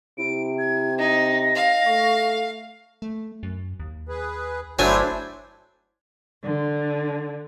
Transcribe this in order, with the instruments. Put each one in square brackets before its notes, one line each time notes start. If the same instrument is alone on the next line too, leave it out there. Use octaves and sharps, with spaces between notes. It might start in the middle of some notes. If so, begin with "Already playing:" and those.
[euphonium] C3 [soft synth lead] E4 [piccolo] D7
[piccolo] G#6
[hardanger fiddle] D#4 [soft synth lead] D#5 [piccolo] A#6
[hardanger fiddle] F5
[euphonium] A3 [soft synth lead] C#6
[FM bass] A3
F#2
D#2
[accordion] G#4 B4
[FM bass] G1 [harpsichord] F#3 A3 [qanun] D4 G#5 [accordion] E4 C5
[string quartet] D3